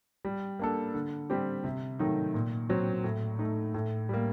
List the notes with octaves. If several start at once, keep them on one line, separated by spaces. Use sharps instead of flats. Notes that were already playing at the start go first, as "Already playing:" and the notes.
G3
A#3 D4 A4
D3
G3 C4 G4
C3
D#3 F#3 A3 D#4
A#2
F#3 C4 F#4
A2
A3 D#4
A2
G3 A#3